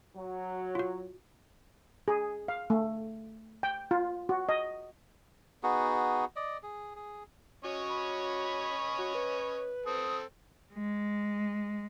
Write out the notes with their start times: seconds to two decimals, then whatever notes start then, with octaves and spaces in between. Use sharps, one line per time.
0.17 F#3
0.75 F4 F#4
2.08 G#4
2.48 F5
2.70 A3
3.63 G5
3.91 F4
4.29 F#4
4.49 D#5
5.63 B3 D#4 F#4 G#4
6.36 D5 D#5
6.63 G#4
6.96 G#4
7.65 C#4 F#4 C#5 D#5
7.89 B5
8.98 F#4
9.15 B4
9.86 C4 A4 D#6
10.73 G#3